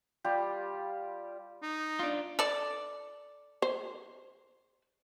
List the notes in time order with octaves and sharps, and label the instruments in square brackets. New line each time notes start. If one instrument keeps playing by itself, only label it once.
[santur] G3 F4 G4
[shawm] D#4
[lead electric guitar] D4 F4
[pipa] A4 D5
[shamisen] C5